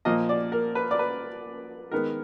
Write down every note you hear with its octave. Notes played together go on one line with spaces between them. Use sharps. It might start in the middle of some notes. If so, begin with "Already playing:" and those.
A#2 F3 A#3 D#5
D5
A#4
B4
D5
B4
D#3 G#3 B3 A#4